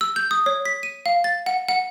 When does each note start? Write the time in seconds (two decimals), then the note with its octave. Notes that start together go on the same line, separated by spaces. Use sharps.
0.01 E6
0.16 G6
0.31 D#6
0.46 C#5
0.65 B6
0.83 D#7
1.06 F5
1.24 A6
1.46 F#5
1.68 F#5